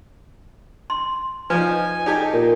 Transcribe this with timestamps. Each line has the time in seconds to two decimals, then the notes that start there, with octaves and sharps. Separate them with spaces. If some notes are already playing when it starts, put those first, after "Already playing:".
0.90 C6
1.50 F3 D#4 B4 G#5
2.06 D#4 G4 A4
2.33 A#2